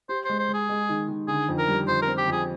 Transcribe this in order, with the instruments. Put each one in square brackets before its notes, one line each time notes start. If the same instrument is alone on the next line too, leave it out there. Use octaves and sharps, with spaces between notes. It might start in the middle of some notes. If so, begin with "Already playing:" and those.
[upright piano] G4 [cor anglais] C5
[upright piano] G#3 [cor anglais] C5
[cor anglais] C5
[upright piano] G#3
[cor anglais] G#4
[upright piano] G#3
D#3
D#3
[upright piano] D3 [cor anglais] G#4
[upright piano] F2
[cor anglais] A#4
[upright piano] G3
[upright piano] F2 [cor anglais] C5
[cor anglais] A#4
[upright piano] C4
[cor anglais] G4
[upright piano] F2 [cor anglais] G#4